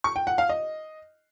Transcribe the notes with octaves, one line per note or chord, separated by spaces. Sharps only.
C#6
G5
F#5
F5
D#5